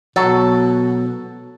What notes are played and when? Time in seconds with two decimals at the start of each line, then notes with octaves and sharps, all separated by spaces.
0.16 B2 F#3 A4